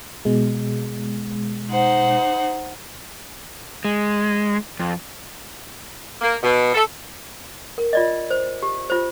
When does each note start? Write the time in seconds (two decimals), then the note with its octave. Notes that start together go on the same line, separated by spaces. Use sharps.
0.25 B2 G#3
1.69 D#4 C5 F#5
3.85 G#3
4.80 F2
6.22 A#3
6.43 B2
6.74 A4
7.78 A#4
7.93 F4 D5 D#5
8.31 C5
8.62 G4
8.90 F4 C5